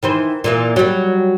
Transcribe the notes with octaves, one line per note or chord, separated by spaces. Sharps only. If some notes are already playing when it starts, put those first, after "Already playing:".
D#3 E3 C5
A#2 E3 A#3
F#3 G3